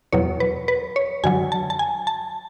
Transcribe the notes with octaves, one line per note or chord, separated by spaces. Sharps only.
E2 B2 F#3 C#5
B4
B4
C#5
F#2 D3 F#3 G#5
A5
A5
G#5
A5